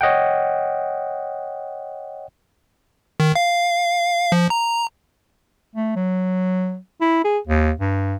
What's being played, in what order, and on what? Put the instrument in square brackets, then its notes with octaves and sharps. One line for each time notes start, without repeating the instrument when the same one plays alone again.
[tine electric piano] C#5 D#5 F#5 G5
[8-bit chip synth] D#3
F5
F3
A#5
[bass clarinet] A3
F#3
E4
G#4
D#2
G2